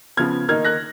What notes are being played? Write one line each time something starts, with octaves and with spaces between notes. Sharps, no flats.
C#3 F3 B3 F6 G#6
D#3 A#3 D#4 F6 G#6
F#6 A#6